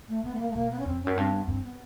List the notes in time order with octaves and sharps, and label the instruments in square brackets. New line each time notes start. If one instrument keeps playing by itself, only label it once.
[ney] A3
[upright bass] C3 [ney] B3
[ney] A3
A#3
A3
[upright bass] B2 [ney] A#3
[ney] B3
C#4
[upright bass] F2 [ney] C4
[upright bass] F#2 [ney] C#4
[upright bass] G2 [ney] C4
[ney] B3
[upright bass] G2 [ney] C4
[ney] B3